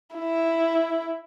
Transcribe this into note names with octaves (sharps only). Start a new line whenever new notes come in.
E4